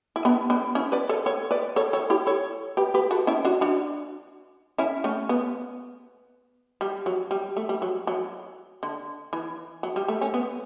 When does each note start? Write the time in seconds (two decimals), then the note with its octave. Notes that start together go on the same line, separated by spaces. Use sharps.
0.16 E4
0.25 B3 D4
0.50 B3 D4
0.75 C#4 E4
0.92 B4 D5
1.09 A4 C#5
1.26 A4 C#5
1.51 B4 D5
1.76 A4 C#5
1.93 A4 C#5
2.10 E4 G4
2.27 A4 C#5
2.77 G4 B4
2.94 G4 B4
3.11 F#4 A4
3.27 C#4 E4
3.45 D4 F#4
3.61 D4 F#4
4.78 C#4 E4
5.04 A3 C#4
5.29 B3
6.81 G3
7.06 F#3
7.31 G3
7.57 A3
7.69 G3
7.82 F#3
8.07 F#3
8.83 D3
9.33 E3
9.83 F#3
9.96 G3
10.08 A3
10.21 A3 C#4
10.34 B3